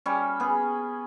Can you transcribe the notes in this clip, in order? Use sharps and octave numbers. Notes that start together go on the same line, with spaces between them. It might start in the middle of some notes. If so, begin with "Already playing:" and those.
G3 C#4
B3 G#4